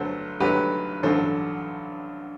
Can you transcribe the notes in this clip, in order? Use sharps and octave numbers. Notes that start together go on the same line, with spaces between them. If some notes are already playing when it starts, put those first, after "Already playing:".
Already playing: G1 G2 F#3 A3 A4 C5
G1 G2 F#3 A3 G4 B4
A1 G2 D3 F#3 A4 C5